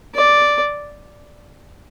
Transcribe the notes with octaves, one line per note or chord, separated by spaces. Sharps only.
D5